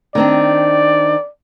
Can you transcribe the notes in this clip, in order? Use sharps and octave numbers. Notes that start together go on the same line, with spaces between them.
D#3 C4 D4 D5